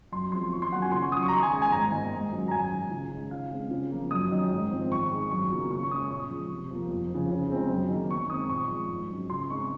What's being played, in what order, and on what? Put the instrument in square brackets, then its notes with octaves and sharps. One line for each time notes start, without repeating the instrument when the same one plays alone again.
[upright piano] F#2 C6
F3 G#3 C4 C6
D#3 C#6
C6
F#3 A#3 C#4 F#5
G#5
C#3 C6
C#6
C#4 D#6
F#3
C#6
A#5
D#3 C6
G#5
G#3 C#4
G#5
G#2 A#5
D#3 A#3 D#4
G#2
F#3 C#4
A#5
F#2 G#5
D#3 G#3
C#3
G#3 D#4
C#3 F5
G#3 C4
C#3
F3 A#3
F#2 D#6
D#3 F#3 C#4
G#2
F3 C4
D#3 C#6
G#3 D#4
F#2 C#6
C#3 F#3 A#3
C#3 C#6
C#6
G#3 D#6
C#4
A#2 C#6
F3 G#3
C3
F3 A#3
F2
C#3 F3
C#3
G#3 C4 D#4
F#2
D#3 A#3
D#3 C#6
G#3 D#6
C4 D#4
A#2 C#6
F3 G#3 D#4
G#2
F#3 C#4
C#3 C6
G#3 C4 D#4 C#6